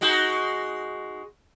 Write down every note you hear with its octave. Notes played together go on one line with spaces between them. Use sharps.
G#3 D#4 F#4